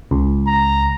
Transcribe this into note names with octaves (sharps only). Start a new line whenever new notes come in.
C#2
A#5